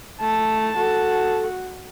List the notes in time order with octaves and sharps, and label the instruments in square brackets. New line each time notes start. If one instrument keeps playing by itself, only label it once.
[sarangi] A3 [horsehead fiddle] A5
[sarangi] F#4 [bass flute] A4